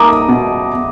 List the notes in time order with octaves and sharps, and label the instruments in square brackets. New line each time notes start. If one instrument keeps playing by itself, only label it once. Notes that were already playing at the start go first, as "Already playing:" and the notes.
Already playing: [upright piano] A#3 D#4 A#4 [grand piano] A#5 D6 D#6
[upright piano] B2